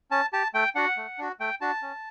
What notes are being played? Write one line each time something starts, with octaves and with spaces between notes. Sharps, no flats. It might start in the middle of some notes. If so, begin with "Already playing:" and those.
C#4 A5
G4 A5
A3 G5
D4 F#4 F#5
A3
D4 F#4
A3 G5
D4 F#4 A5
C#4